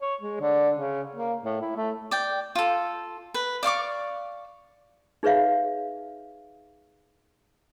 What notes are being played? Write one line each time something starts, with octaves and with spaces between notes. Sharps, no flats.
C#5
G#3
D3
C#3
A#3
A2
E4
A3
D5 G5
F4 A4
B4
D5 F5 C#6 D6
D#4 G#4 B4 C#5 E5 F5